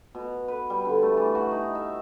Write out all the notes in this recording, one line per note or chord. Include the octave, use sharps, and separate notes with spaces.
B2
B4
G3
D3
A3
E3
F#4
D#4
E5